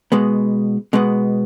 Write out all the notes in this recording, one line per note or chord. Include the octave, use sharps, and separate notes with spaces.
B2 G#3 B3
B2 G#3 B3